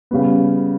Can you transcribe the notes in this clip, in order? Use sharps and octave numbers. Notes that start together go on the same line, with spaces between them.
C#3 G3 B3